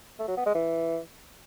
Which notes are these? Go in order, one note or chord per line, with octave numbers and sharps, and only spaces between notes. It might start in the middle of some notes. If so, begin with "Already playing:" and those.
A3
F#3
B3
G#3
E3